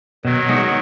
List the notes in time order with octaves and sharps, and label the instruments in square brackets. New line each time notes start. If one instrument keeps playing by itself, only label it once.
[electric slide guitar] B2 [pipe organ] D#3 F#3
[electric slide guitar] G#3 D#4 F#4